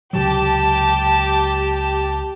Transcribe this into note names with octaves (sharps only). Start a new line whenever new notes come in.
C#2 C3 F#3 G4 A5